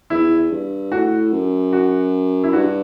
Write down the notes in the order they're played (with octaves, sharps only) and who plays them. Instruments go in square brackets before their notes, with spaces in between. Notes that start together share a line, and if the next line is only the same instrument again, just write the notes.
[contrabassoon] E2 [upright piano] E4
[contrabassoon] G2
[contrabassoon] A2 [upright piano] F#4
[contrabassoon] F#2
[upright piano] F#4
E4
[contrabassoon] G2 [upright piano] F#4